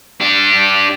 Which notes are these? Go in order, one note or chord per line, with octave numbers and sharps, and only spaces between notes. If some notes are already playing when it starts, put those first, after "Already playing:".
D4 G4